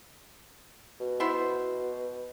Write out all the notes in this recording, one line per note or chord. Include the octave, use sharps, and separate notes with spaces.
B2
B3 E4 C5